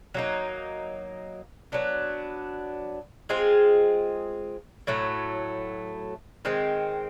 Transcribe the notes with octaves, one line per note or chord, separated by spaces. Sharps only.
F#3 A#3 D#4
F#3 B3 D4
G#3 C4 F4 G#4
A2 F#3 A3
D#3 G#3 C4